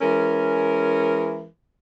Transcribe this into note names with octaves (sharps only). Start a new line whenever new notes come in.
E3 G#3 C#4 A#4